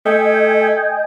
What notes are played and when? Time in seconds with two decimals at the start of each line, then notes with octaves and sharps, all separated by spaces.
0.06 A3 D#5 G5 G#5